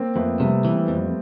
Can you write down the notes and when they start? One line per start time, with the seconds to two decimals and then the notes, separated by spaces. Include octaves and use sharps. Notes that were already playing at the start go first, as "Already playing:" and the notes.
Already playing: A#3 C4
0.16 F2 A3 B3
0.40 C3 G3 A3
0.65 E3
0.88 F2